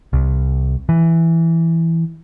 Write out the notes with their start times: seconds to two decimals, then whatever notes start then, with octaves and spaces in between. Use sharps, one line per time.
0.13 C2
0.89 E3